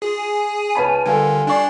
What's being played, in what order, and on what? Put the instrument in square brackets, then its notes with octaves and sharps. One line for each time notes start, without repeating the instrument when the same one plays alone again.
[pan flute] F4 [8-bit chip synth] G#4
[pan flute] G#5
[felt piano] C#2 C#5 B5 [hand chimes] B4 A5
[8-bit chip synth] D3 [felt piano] G3 F4 A4 [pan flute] A#4 [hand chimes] G#5
[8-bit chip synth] D4 D5 [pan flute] F5 [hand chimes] G#5 C#6